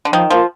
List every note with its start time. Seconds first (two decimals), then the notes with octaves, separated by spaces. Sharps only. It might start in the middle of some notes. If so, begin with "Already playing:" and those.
0.05 D3
0.13 D#3 F3
0.30 F3 A#3 F4